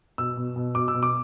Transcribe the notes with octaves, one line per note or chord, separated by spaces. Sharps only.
B2 E6
B2
B2
B2 D6
E6
B2
D6